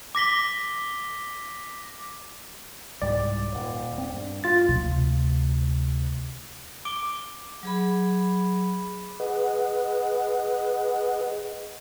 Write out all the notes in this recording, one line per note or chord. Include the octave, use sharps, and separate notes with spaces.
D6 A#6 B6 G7
C2 G#2 G3 D5
D#1
C4
G2
F4 A6
D2 C3
D6 D7 G7
F#3 G#4 B5
G#4 B4 D#5 F#5